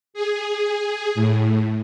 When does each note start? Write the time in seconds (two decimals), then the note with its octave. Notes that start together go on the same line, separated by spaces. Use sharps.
0.14 G#4
1.15 A2